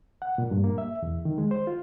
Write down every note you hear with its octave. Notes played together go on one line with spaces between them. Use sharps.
F#5
A#2
G2
A#3
E5
E2
D#3
G#3
C5
F4